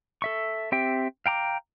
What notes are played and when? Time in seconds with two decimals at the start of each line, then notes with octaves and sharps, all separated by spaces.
0.22 A4 E5 C#6
0.72 C4 G4 E5 G5
1.26 F5 G5 A#5 D6